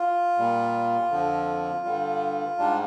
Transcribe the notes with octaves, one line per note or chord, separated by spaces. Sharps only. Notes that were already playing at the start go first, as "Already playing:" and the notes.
Already playing: F4
A#2 G3
F2 D3 F3
G2 D3 G3
G#2 G3 D4